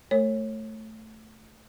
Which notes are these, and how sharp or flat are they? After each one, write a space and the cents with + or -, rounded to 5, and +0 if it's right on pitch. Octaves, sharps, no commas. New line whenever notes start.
A3 +0 A4 +45 C#5 -25